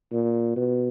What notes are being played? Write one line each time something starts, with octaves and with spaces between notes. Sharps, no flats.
A#2
B2